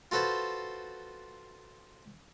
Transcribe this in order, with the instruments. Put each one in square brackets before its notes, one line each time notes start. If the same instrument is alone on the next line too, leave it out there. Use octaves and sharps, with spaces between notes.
[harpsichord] F4 F#4 A4 B4 C5